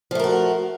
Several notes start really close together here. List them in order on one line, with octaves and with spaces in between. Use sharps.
F3 A3 A#4 F#4